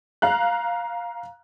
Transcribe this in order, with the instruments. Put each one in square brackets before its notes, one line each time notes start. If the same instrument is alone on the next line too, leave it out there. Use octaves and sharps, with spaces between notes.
[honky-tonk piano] F5 A#5 F#6